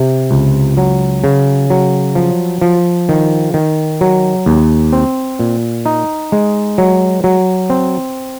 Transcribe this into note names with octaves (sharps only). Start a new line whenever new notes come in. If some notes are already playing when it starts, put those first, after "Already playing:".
Already playing: C3
C#2
F#3
C#3
F#3
F3
F3
D#3
D#3
F#3
D#2
C4
A#2
D#4
G#3
F#3
F#3
C4